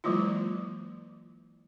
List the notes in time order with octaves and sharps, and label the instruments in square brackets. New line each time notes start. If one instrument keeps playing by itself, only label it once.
[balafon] E3 F#3 G#3 A#3 E4 F4